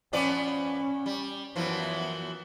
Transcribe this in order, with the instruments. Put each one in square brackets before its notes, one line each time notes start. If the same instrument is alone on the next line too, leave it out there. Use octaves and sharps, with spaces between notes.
[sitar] F3 B3 D5 [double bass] C#4
[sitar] G3
[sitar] F#2 E3 F3 [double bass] B3